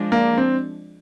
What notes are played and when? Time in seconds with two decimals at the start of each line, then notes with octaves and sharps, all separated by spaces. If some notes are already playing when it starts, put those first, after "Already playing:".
Already playing: F3 G#3 D4
0.12 A#3
0.38 C4